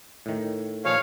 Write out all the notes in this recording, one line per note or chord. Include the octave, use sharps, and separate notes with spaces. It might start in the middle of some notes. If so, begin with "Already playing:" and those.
A2 D#3
A#2 F3 G#4 C#5 F5